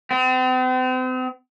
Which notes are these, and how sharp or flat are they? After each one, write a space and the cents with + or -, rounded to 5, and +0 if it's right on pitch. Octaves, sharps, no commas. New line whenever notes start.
C4 -40